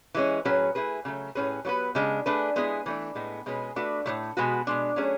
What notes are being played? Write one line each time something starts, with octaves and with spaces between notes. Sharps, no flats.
E3 G#3 C#4
A2 F#3 C#4 G#4 B4
A3 E4 G#4 B4
C#3 F#3 A3
A2 F#3 C#4 G#4 B4
F#3 B3 F#4 B4
C#3 G#3 D4
A3 D4 G#4 B4
G#3 B3 E4 G#4
E3 A3 D4
A2 G#3 B3
B2 G#3 C#4 G#4 B4
A3 D4 F#4 B4
A2 F#3 A3
B2 G#3 B3 F#4
B2 G#3 D4
F#3 A3 C#4 G#4